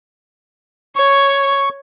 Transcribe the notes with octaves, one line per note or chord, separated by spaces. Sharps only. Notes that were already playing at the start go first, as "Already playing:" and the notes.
C#5 C#6